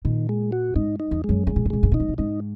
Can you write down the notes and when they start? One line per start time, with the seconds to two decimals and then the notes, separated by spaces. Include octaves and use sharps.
0.05 A#2 D#3
0.29 G#3
0.52 F#4
0.75 G#2 D#4
1.00 D#4
1.11 E2
1.24 F#2 G#3
1.47 G#2 G#3
1.56 A#2
1.65 G#2
1.70 A#2 G#3
1.83 G#2
1.92 A#2 D#4
2.00 G#2
2.09 A#2
2.18 G#2 D#4